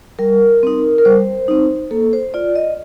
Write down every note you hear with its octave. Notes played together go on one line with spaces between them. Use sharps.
G3 A#4
C4 D#4
A#4
G3 C5
C4 D#4
A#3 A4
C5
F4 D5
D#5